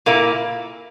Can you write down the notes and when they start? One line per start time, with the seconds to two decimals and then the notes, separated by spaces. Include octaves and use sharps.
0.06 A#2 A#3 E4